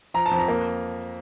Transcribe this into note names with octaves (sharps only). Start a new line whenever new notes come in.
F3 A#5
A5
F2
A#5
A#3